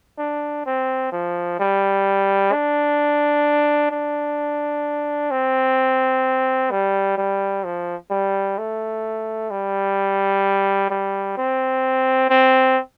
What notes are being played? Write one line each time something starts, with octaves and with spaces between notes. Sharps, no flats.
D4
C4
F3
G3
D4
D4
C4
G3
G3
F3
G3
A3
G3
G3
C4
C4